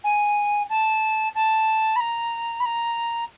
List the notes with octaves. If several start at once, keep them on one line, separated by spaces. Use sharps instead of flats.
G#5
A5
A5
B5
A#5
B5
A#5